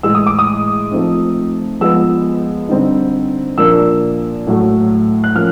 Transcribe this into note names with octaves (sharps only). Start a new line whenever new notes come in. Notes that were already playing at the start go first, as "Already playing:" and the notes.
A2 E3 G#3 E6
D#6
D6
D#6
F3 A3 C4 D#4
F3 G#3 B3 E6
D3 G3 C4 D#4
A#2 F3 A#3 D4 E6
A2 F#3 A3
F#6
F3 A#3 C#4 F6